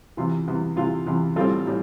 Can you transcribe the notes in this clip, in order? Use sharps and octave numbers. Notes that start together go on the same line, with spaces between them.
E2 C3 E3 F4
E2 C3 E3
E2 C3 E3 F4
E2 C3 E3
A1 A2 G3 C4 F4 A4
A2 G3